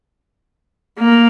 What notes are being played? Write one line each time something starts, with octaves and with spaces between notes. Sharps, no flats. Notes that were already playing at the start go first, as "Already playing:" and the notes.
A#3